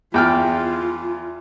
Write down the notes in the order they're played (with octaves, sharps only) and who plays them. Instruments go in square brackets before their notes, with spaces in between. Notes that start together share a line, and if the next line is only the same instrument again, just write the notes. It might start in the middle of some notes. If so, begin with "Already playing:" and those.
[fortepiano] E2 G5 F6 [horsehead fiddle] F4